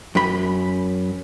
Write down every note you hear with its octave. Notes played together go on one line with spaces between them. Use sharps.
F#2 B5